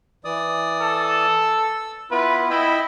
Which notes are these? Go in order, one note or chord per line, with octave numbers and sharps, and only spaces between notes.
E3 D5 D#6
A4
E6
B3 E4 F4 B4
E4 D#5 G5 B5